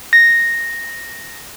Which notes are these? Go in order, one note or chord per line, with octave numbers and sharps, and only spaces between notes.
A#6